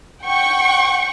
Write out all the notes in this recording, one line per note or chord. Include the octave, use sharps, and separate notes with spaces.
F#5 G5 C#6